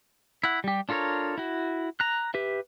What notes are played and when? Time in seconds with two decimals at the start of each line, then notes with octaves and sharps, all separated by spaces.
0.44 E4 F#5
0.64 G3 G4
0.89 D4 F4 A4 A#4 C#5
1.38 E4 F#4
2.00 A#5 F#6
2.34 G4 B4 E5